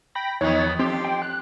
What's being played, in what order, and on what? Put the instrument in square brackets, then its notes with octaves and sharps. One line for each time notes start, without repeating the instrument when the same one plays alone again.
[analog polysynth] G5 B5 A#6
[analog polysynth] E2 [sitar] D#3 F3 B3 [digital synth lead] C#5
[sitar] F2 G4 [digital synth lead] C4 [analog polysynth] C6
[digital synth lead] G5
F#6